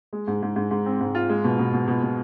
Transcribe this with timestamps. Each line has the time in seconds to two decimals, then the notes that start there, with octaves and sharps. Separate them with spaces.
0.13 G#3
0.27 G#2
0.42 G#2
0.56 G#2
0.71 G#2
0.86 C4
1.01 G#2
1.15 F4
1.29 G#3
1.44 B2
1.59 B2
1.73 B2
1.88 B2
2.03 B2